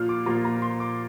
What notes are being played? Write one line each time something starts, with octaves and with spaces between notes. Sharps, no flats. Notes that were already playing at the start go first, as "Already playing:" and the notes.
Already playing: A#2 F3 A#3 F4 F6
D6
A#2 F3 A#3 F4 A#5
A#5
C6
D6